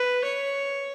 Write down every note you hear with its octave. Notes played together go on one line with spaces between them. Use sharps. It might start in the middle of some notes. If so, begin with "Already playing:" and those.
Already playing: B4
C#5